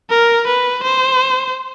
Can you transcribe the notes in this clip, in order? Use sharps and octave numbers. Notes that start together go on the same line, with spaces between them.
A#4
B4
C5